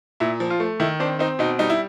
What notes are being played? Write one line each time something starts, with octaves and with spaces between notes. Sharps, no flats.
A#2 E4
F3
F4
A3
D#3 E4
C4 D4
C4 D#4
B2 D#4
G3 D#4
E4